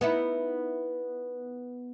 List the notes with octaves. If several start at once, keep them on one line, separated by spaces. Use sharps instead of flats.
B3 D#4 E4